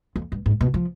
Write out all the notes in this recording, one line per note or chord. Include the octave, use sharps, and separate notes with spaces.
F2
G2
G#2
B2
F3